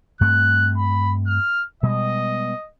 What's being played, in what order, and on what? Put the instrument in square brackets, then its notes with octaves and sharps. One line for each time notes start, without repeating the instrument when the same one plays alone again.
[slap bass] G2 A3 C4 [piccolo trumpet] F#6
[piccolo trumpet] B5
F6
[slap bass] B2 G3 G#3 [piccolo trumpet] D#5